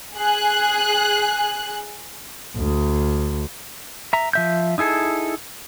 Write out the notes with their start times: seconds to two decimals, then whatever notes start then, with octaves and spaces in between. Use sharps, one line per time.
0.15 G#4 F#6
2.57 D2
4.13 E5 A#5
4.33 F3 E5 G6
4.78 D#4 E4 G#4 A4